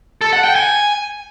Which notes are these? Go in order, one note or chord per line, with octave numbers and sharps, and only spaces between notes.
A4
F#5
G5
G#5